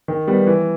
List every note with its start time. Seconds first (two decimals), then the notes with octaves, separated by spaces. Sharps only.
0.08 D#3
0.27 G3 B3
0.47 E3